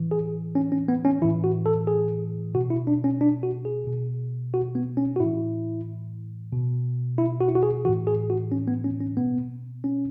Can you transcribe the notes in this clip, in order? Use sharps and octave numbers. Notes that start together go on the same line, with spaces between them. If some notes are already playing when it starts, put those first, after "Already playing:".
Already playing: A2 E3
G#4
C#4
C#4
B3
C#4
A2 E3 E4
F#4
A4
G#4
B2 F#4
E4
D4
C#4
D4
F#4
G#4
B2
F#4
B3
C#4
F#4
A2 E3 E4
B2
E4
F#4
E4
F#4
G#4
A2 E3 F#4
G#4
F#4
C#4
B3
C#4
C#4
B2 B3
C#4